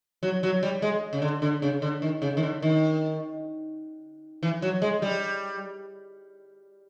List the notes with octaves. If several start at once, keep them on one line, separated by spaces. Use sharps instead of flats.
F#3
F#3
G3
G#3
C#3
D3
D3
C#3
D3
D#3
C#3
D#3
D3
D#3
E3
F#3
G#3
G3